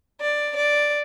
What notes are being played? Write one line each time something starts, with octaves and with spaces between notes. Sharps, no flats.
D5
D5